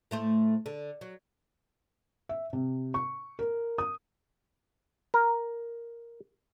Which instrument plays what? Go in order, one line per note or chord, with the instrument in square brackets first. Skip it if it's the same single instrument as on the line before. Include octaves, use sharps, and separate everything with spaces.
[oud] A2 A3 C5
D3
F#3
[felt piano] E5
C3
C#6
A#4
D#6
[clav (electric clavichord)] A#4